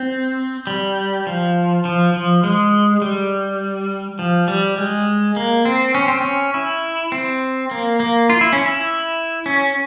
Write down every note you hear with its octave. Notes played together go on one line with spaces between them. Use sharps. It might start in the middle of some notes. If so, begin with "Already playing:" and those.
Already playing: C4
G3
F3
F3
F3
G#3
G3
F3
G3
G#3
A#3
C4
C#4
C4
C#4
E4
C4
A#3
A#3
F4
E4
C#4
E4
C#4